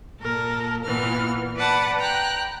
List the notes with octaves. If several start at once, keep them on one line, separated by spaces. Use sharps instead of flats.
A#2 A4 A#4
A#2 E3 B3 F6
B4 D5 F#5 A5 B5
G5 A#5 F#6